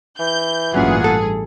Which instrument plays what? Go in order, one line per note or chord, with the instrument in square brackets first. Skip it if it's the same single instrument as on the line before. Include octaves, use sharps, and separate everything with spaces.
[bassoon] E3 [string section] G6
[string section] A1 G2 G#4 [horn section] A#2 F#5 [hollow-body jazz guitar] F#3 C#4
[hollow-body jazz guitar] A4